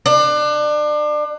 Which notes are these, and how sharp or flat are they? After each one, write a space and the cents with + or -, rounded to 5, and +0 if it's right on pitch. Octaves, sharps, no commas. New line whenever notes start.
D4 +30